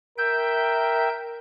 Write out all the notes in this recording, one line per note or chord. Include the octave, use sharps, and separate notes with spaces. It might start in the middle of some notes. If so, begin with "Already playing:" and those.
A#4 E5 G5 G6